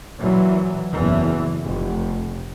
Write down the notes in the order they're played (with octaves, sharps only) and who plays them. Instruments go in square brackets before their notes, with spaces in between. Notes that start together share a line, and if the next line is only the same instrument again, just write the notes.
[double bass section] A#2 E3 F#3
F#1 E2 E3
F1